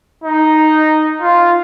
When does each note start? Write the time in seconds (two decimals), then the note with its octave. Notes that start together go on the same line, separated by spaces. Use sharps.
0.24 D#4
1.21 F4